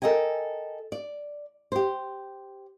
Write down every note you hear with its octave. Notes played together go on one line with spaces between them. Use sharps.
A4 A#4 D#5 G5 G#5
D5
G4 C5